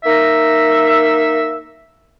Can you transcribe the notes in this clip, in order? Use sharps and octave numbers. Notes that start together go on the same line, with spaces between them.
A#3 D#4 E5